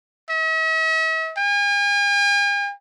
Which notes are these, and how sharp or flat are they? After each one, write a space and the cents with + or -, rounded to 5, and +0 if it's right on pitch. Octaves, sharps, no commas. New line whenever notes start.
E5 -45
G#5 -45